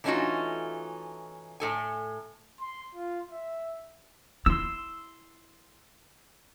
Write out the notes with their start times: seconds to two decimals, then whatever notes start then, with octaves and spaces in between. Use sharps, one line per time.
0.04 E3 A3 C#4 D#4 F4 F#4
1.60 A2 A4 G#5
2.61 C6
2.95 F4
3.32 E5
4.46 E4 C6 E6